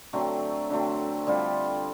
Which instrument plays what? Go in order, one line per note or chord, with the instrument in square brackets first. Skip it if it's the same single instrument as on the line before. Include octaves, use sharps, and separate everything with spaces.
[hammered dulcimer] D3 F#3 A3 C4
D3 F#3 A3 C4
D3 G3 C4 F4